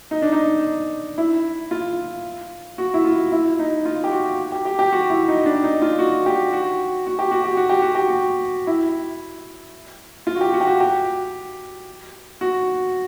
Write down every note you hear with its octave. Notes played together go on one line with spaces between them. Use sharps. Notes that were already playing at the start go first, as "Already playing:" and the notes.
D#4
D4
D#4
E4
F4
F#4
E4
F4
E4
D#4
F4
G4
F#4
G4
G4
G4
F#4
E4
D#4
D4
D#4
F4
F#4
G4
F#4
F#4
G4
F#4
G4
F#4
G4
F#4
G4
F#4
E4
F4
F#4
G4
F#4
G4
F#4
G4
F#4